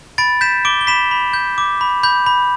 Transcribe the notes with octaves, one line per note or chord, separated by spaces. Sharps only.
B5 A6 D7
G6 B6 E7
D6 D7 G7
G7
B5 B6 E7
B5
G6
D6
B5
B5 G6
B5